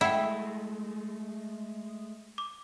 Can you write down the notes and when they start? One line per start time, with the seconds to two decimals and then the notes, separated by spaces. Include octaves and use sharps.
0.01 G#3 A3 E4 F#5 G5
2.38 D6